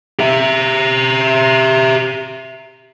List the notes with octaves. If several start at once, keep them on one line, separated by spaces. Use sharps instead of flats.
G4 E5